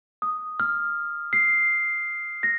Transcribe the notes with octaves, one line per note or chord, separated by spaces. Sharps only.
D#6
F6
C7
A#6